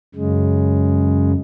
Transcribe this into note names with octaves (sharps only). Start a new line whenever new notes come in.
F#2 C#3 G#3